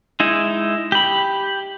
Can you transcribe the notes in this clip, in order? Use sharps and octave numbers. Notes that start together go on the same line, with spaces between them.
G#3 D#4 E4
G4 B5